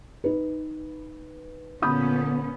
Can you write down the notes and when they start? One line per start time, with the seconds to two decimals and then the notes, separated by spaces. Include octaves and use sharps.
0.24 D#4 B4
1.82 A#2 D3 B3 C#4 B5 D#6 G6